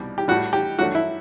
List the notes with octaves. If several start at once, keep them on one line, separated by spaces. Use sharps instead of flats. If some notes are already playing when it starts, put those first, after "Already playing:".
Already playing: C2 B2 G3
G4
A2 G3 F#4
G4
G2 F#3 A3 F#4
E4